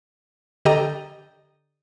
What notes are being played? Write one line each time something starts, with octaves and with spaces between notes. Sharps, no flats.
D3 G4 A4 D#5 G5 A#5